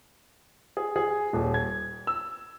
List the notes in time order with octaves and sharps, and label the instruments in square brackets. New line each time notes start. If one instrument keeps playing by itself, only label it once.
[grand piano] G#4
G#4
D#1
G#6
E6